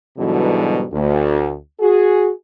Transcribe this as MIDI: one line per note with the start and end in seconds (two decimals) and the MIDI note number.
0.18 0.84 44
0.18 0.84 47
0.18 0.84 50
0.18 0.84 52
0.18 0.84 54
0.18 0.84 55
0.92 1.53 38
1.80 2.30 66
1.80 2.30 68